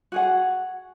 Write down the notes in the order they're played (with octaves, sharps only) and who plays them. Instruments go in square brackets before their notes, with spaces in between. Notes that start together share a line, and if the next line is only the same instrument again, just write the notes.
[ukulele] F#4 G#4 F#5